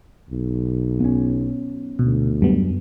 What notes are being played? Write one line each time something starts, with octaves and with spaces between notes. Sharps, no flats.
B1
B3 C#4
D2 B2
F#2 G3 B3